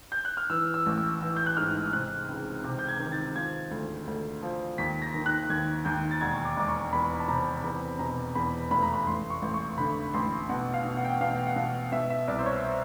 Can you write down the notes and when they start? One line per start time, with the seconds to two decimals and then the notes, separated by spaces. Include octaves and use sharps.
0.12 G6
0.25 F#6
0.37 F6
0.50 E3 E6
0.74 E6
0.86 A1
0.98 E6
1.22 E3 E6
1.36 G6
1.46 F#6
1.57 G#2 F6
1.93 C3 F#6
2.28 C#2
2.64 C3
2.79 G6
2.88 G#6
3.00 D#3
3.12 A6
3.36 F3 G#6
3.71 D2
4.07 D2
4.43 F3
4.78 D#2 B6
5.02 A#6
5.14 D#3
5.26 F#6
5.50 D#2 G#6
5.85 D#2 G6
6.11 A6
6.21 E1 G#6
6.34 C#6
6.45 D6
6.57 E1 D6
6.68 C#6
6.93 E2 B5
7.20 A5
7.28 C3 A#5
7.64 E2 B5
7.99 B2 A#5
8.35 E2 B5
8.71 F1 B5
8.83 A#5
8.94 B5
9.07 A1 C6
9.30 C#6
9.42 A1
9.54 C#6
9.78 D3 B5
10.13 A1 C6
10.49 B2 F#5
10.74 F5
10.85 B2
10.97 F#5
11.04 G5
11.11 F#5
11.21 B2 F5
11.36 G5
11.47 F#5
11.56 B2 F5
11.92 B2 E5
12.10 E5
12.28 C2 D5
12.38 C5
12.46 C#5
12.64 C5